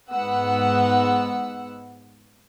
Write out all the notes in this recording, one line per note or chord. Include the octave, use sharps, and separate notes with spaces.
G#2 B3 F#5 E6